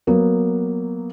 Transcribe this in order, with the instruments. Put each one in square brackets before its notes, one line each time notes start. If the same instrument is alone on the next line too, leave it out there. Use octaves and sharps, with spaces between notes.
[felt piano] F#3 A#3 B3